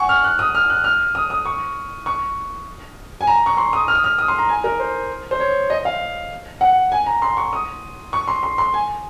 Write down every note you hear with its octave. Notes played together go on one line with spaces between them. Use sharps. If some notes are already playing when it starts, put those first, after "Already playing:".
Already playing: F#5 G#5 C#6
F6
F#6
D#6
F6
F#6
F6
D#6
D#6
C#6
C#6
G#5
A#5
C#6
C6
D#6
F6
D#6
F6
D#6
C6
A#5
G#5
A#4
C5
C5
C#5
D#5
F5
F#5
G#5
A#5
C6
C#6
D#6
C#6
C6
C6
C6
G#5